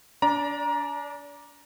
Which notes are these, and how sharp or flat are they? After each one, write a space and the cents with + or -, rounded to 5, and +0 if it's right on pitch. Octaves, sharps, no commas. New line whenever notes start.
D4 -35 D5 +0 A#5 +20